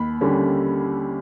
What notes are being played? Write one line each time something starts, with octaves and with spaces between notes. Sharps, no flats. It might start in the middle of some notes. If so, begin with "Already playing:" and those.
Already playing: D#2 B5
D3 G3 A#3 C#4